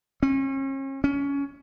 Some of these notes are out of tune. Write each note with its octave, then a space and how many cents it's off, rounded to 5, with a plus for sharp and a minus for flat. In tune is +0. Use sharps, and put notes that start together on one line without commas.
C#4 -40
C#4 +20